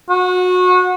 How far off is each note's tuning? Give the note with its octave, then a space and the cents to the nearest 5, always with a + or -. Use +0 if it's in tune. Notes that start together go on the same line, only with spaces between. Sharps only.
F#4 -25